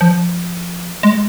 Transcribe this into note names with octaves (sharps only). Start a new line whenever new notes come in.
F3
G#3